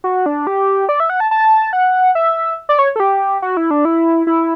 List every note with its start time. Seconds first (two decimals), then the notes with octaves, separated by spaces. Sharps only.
0.04 F#4
0.26 D4
0.47 G4
0.89 D5
1.00 E5
1.10 F#5
1.20 A5
1.31 A5
1.73 F#5
2.15 E5
2.69 D5
2.79 C#5
2.96 A4
3.00 G4
3.42 F#4
3.57 E4
3.71 D4
3.85 E4
4.27 E4